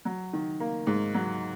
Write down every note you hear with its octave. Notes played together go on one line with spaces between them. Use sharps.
F#3
D#3
A#3
G#2
F#3